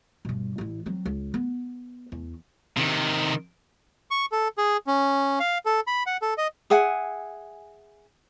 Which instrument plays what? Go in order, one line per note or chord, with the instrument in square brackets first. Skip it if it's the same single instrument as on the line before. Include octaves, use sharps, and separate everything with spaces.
[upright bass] G2 B2
A1 E4
F#3 C4
C#2
B3
E2
[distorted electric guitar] C3 D#3
[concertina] C#6
A4
G#4
C#4
F5
A4
B5
F#5
A4
D#5
[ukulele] G#4 E5 F#5 G#5